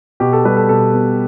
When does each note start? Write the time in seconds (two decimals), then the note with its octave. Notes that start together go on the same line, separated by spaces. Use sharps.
0.20 B2 G4
0.33 A4
0.45 G3 B4
0.57 A4
0.69 B2 A4
0.93 B3